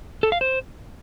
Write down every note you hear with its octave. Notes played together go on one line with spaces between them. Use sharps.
A4
F5
C5